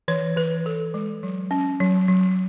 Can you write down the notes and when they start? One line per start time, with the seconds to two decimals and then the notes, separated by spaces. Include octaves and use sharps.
0.08 E3 C#5
0.36 E3 B4
0.66 E3 A4
0.94 G#3
1.23 F#3
1.51 C#4
1.80 F#3
2.08 F#3